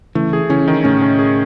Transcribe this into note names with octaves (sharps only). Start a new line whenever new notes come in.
C#3 E3 A3
G#4
C#3 E3 C#4
D#3
A2 C#3 C#4
C#4
G#4